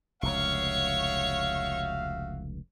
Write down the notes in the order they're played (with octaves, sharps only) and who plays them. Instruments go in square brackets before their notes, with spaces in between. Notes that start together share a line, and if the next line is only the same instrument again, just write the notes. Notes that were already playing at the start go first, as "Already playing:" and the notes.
[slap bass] F1 C#2 [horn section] F#4 E5 F5 [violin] C#5 C#6